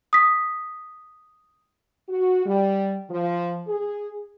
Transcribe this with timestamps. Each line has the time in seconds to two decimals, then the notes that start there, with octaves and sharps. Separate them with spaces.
0.13 D#6 B6
2.09 F#4
2.46 G3
3.10 F3
3.68 G#4